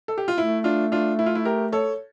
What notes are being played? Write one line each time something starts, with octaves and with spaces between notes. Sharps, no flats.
A4
G4
F4
A3 E4
D4 F4
D4 F4
E4
F4
E4
G4 A#4
A4 C#5